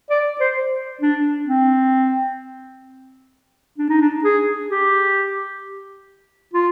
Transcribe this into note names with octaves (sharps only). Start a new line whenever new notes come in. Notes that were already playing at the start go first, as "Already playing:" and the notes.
D5
C5
D4
C4
D4
D#4
D4
G#4
G4
F4